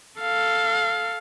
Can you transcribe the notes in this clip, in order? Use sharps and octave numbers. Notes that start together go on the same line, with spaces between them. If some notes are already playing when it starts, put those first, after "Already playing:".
A4 F5